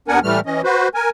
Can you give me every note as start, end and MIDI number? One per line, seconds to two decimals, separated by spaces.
0.08 0.20 39
0.08 0.20 59
0.08 0.20 62
0.08 0.20 70
0.08 0.20 78
0.08 0.20 80
0.23 0.40 45
0.23 0.40 52
0.23 0.40 55
0.23 0.40 57
0.23 0.40 89
0.46 0.61 52
0.46 0.61 61
0.46 0.61 75
0.64 0.88 66
0.64 0.88 71
0.64 0.88 72
0.94 1.10 70
0.94 1.10 80